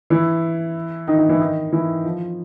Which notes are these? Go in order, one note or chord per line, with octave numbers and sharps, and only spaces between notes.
E3 E4
D#3 D#4
D#3 D#4
E3 E4
D#3 D#4
E3 E4
F3 F4